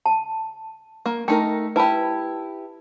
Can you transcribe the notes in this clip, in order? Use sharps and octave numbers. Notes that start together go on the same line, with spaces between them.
A5
A#3
A3 D#4 A#4 G5
E4 G4 B4 A5 B5